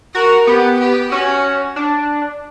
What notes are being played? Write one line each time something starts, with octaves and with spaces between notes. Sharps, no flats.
F#4 A#4
B3 G4
G4
C#4 F#4
D4